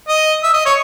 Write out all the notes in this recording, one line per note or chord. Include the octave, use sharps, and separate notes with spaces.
D#5
E5
D#5
C#5